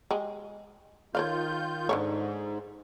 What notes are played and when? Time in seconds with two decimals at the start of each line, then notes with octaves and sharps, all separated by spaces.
0.11 G#3 G4
1.15 D#3 F4 C#5 D5 F5 G6
1.89 G#2 D3 A3 C#5